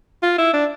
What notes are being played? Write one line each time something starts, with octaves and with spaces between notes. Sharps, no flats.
F4
E4
D4